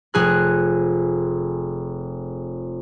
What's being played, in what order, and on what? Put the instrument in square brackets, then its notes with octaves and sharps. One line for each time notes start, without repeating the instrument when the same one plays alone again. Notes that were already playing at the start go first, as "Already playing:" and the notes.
[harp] F1 G#4 F#6